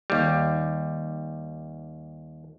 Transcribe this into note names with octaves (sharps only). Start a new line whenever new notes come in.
D#2 G3